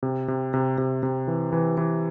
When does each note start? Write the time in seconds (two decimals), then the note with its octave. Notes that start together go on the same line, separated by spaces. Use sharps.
0.03 C3
0.28 C3
0.54 C3
0.78 C3
1.03 C3
1.28 E3
1.52 E3
1.78 E3